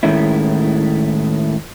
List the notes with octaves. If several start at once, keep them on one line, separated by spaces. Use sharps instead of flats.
A2 D#3 G#3 A3 C#4 E4